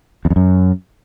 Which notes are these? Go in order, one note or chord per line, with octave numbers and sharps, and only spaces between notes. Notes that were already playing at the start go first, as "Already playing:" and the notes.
E2
F2
F#2